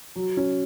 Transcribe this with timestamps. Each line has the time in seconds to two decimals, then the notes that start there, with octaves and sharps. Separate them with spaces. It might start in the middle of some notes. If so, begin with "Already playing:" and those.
0.16 F#3
0.37 C#4